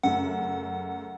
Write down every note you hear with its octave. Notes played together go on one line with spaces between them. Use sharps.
F#2 C#3 A3 F#5